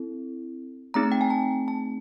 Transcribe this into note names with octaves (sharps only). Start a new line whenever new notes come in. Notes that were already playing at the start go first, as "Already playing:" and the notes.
Already playing: C4 E4 A4
A3 C4 D#4 G#4 A#5
G5
G#5
A5
A5